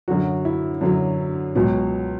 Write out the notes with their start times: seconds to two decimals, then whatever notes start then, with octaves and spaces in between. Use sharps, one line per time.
0.08 F#2 D3 F#3 F#4
0.45 E4
0.81 F#2 D3 F#3
1.55 C#2 B2 F#3